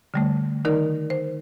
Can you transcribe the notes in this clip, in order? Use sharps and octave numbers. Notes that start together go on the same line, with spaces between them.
D3 G3 A3
D#3 D#4 A#4 D5
C5